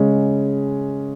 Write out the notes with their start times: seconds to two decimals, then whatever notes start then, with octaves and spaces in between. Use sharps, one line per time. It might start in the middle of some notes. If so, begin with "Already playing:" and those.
Already playing: C#3 G#3 C#4 G#4